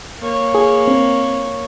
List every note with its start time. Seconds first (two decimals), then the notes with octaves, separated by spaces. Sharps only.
0.20 A#3 C#5
0.55 G#4
0.87 C4